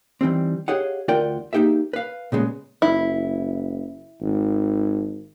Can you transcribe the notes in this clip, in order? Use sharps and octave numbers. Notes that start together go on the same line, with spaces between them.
D#3 E3 G3 C4
G4 G#4 C#5 D#5 F5 F#5
D2 F4 A#4 D5 F#5 G5
A#3 D#4 G4 G#4 E5
B4 F5
A#2 C#3 G#3 B3
F#1 E4
G#1